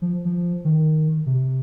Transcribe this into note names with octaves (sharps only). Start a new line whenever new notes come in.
F3
F3
D#3
C3